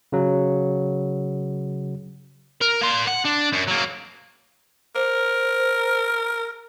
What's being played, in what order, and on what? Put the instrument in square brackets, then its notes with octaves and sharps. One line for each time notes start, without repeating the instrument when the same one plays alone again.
[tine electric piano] C#3 F#3
[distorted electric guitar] A#4
A#3 C6
F#5
D4
F#2
F#3 A#3
[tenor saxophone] A#4 [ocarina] C5